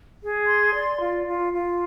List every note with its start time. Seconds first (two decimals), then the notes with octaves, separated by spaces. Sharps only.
0.20 G#4
0.46 C6
0.73 D5
0.99 F4
1.26 F4
1.53 F4